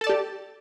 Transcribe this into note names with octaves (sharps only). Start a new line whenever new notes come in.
G4 A4 D5 A5